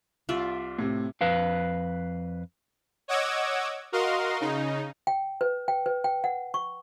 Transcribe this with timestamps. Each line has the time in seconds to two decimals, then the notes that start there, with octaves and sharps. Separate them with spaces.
0.29 C2 F4 D5 E5
0.79 A2 C3
1.21 F2 B4 F5
3.08 C#5 D#5 F#5 D6 E6 G#6
3.92 F#4 A#4 D#5 F5 C6
4.40 C#3 D#4
5.07 G5
5.41 B4
5.68 G5
5.86 B4
6.04 G5
6.24 F#5
6.54 C#6